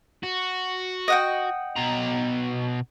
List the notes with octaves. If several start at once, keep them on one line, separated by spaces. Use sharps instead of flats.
F#4
D#5 F#5 G5
B2 A#5